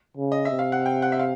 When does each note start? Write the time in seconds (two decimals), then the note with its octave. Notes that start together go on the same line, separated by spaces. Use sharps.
0.17 C#3
0.32 D#5
0.45 E5
0.51 C3
0.59 F5
0.72 F#5
0.86 G5
1.02 F#5
1.12 E5
1.19 F5